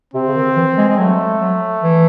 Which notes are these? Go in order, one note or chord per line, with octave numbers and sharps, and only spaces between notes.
C3 C4
C#3
D#3
E3
G#3
G#3
F#3 A3
F#3
E3